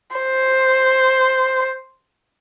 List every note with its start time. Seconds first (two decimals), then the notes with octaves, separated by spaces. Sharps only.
0.17 C5